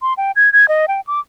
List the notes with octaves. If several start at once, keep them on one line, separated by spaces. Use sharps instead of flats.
C6
G5
G#6
G#6
D#5
G5
D6